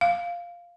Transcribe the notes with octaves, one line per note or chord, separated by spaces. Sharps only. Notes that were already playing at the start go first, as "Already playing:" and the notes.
F5